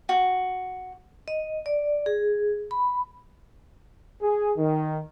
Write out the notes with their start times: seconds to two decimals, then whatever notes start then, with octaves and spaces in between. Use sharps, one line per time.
0.09 F#4
1.28 D#5
1.66 D5
2.06 G#4
2.71 B5
4.22 G#4
4.57 D#3